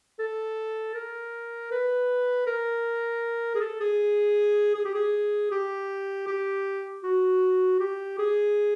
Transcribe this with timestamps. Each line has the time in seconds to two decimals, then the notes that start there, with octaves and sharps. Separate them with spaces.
0.19 A4
0.95 A#4
1.72 B4
2.47 A#4
3.55 G#4
3.61 A4
3.80 G#4
4.75 G#4
4.85 G4
4.95 G#4
5.52 G4
6.27 G4
7.04 F#4
7.80 G4
8.19 G#4